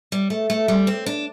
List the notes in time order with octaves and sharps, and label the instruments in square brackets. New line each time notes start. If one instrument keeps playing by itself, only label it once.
[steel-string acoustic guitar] G3
A3
A3
G3
C4
D4